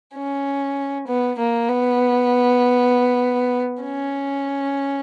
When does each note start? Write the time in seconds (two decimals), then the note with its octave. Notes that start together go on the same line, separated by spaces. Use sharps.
0.15 C#4
1.07 B3
1.38 A#3
1.68 B3
3.83 C#4